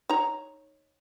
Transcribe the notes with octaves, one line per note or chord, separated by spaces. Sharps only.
D#4 C#5 A#5